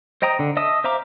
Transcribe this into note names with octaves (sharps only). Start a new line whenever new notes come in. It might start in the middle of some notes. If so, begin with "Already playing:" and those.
C5 D#5 G5 A#5 D#6
D3
D#5 E5 A5 D#6
C5 E5 F5 A#5 D6